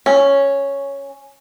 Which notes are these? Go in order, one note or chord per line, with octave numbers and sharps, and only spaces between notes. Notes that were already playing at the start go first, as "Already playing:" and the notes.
C#4